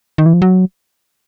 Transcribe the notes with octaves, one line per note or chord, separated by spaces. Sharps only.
D#3
E3
F3
F#3